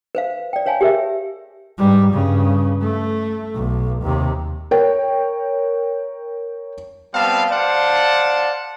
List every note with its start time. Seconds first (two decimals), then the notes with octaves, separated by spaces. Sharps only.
0.15 B4 C5 F5
0.53 D5 G5
0.66 B4 C#5 F5 G#5 A5 B5
0.81 G4 G#4 A#4 B4 E5
1.78 G#2 G3
2.12 G2 C#3
2.82 A3
3.55 B1
4.03 D#2 C3
4.71 A#4 C#5 G5
7.14 G3 B3 C4 F5 A5
7.52 C5 D5 F5 F#5 A5